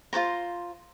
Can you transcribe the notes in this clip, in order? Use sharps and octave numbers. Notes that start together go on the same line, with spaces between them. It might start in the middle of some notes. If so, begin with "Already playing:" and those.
F4 A4 C5 A#5